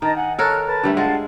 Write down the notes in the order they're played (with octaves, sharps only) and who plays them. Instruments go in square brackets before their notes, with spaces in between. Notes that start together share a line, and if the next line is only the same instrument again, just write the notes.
[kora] D#3 [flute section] D#5 A5 A#5
[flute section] F#5 G#5
[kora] A4 A#4 C#5 [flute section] A5 F6 F#6
[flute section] B4 A5
[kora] D3 G3 A3
[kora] G#3 [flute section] F4 F#5 A5